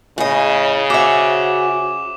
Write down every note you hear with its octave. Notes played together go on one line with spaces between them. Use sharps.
A2 C#3 D#5 G#5 B5
F#4 C5 E5 F#5 G#5 D6 E7